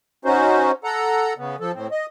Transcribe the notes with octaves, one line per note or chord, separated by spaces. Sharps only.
C#4 D#4 F#4 C5
A4 F#5 A#5
C#3 B3
F3 A4
A2 C4
D#5